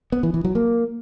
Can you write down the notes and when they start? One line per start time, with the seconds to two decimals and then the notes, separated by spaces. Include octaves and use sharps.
0.12 B3
0.23 E3
0.34 E3
0.45 F#3
0.55 A#3